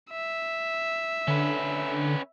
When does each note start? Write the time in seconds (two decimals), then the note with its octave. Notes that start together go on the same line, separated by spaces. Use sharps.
0.11 E5
1.28 D3 C#4 B4